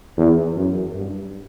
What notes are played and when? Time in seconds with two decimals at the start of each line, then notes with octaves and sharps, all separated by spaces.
0.18 E2
0.57 F#2
0.94 G2